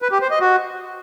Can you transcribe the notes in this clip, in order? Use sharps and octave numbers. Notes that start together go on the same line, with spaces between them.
B4
G4
C5
D#5
F#4